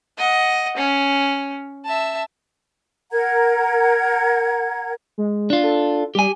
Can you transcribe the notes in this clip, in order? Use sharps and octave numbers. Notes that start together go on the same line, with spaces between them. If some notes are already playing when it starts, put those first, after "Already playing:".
D#5 F#5
C#4
E5 A5
A#4 F#5 A#5 G#6
G#3
D4 F4
A4
G3 G4 G#5